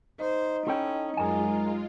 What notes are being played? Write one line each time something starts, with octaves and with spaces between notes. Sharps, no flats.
D#4 C5
C#4 E4 A4 G5
F#2 G#3 F4 G#4 A#4 G#5